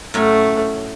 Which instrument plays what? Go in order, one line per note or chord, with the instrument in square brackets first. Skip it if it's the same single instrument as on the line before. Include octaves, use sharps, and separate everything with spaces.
[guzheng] A2 F#3 C#4 [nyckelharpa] A3